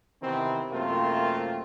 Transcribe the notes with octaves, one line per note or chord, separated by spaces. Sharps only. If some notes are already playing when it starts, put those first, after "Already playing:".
C3 D#3 E3 B3 C4
F#2 C3 A3 A#3 C4 F4